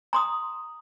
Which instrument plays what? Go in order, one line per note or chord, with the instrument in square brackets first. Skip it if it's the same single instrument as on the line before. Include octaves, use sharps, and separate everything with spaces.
[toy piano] A#5 C6 D#6